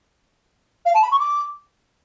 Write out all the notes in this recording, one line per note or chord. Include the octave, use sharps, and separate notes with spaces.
F5
A5
B5
C#6
D6